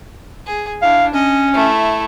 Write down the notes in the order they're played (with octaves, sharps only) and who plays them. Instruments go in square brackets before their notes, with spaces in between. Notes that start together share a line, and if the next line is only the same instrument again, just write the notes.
[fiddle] G#4
[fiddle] D4 E4 [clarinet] F5
[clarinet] C#4 [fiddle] D#5
[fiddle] A3 E4